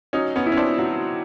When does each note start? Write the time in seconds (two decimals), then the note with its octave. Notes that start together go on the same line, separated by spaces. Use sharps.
0.13 F#3 C#4 D#4
0.36 B3 C#4
0.46 E4
0.52 C#4
0.56 C4 D4
0.79 F#3